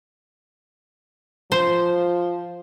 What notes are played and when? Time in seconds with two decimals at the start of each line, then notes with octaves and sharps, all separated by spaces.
1.52 F3 C5